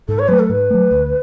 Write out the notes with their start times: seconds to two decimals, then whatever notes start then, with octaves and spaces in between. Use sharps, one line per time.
0.08 G#2 A4
0.19 C#5
0.28 F#3 A3 B4
0.39 A4
0.49 G#2 B4
0.70 F#3 A3
0.91 D2